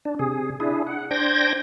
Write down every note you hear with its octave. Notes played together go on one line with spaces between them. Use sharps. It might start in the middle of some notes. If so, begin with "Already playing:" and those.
D4
C3 G#4
D4 E4 G#4
F#5
D4 C5 G5 G6 G#6 A#6